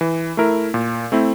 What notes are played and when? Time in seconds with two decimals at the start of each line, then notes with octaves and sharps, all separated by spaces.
0.01 E3
0.37 A3 E4 A#4
0.74 A#2
1.12 A3 C4 E4